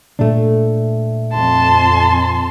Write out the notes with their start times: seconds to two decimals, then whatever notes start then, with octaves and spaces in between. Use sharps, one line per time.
0.19 A#2 A3 D4
1.34 F2 A5 C6